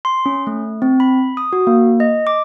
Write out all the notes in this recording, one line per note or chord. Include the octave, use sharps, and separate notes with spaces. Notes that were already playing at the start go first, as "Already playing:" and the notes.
C6
C#4
A3
C4
B5
D#6
F#4
A#3
D#5
D6